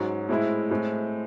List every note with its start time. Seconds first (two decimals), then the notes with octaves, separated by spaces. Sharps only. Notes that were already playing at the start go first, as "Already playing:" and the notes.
Already playing: G#2 F#3 C#4
0.29 A2 G#3 C4 E4
0.70 A2 G#3 C4